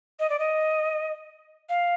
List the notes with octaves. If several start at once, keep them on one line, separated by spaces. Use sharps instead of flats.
D#5
D5
D#5
F5